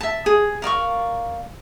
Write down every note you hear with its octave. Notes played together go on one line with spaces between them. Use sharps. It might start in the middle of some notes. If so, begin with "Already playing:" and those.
E5 A5
G#4
A#4 D5 F5 C#6